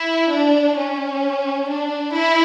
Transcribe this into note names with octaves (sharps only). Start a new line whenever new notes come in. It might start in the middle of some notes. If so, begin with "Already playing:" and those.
Already playing: E4
D4
C#4
D4
E4